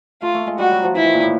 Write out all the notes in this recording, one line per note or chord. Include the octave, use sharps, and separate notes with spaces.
A3 F4
A3
G#3
G3 F#4
F#3
F3
E3 E4
D#3
A#2
A2